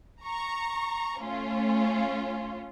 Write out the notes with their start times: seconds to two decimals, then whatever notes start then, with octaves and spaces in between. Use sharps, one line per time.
0.24 A#5 C#6
1.19 A3 C#4 F4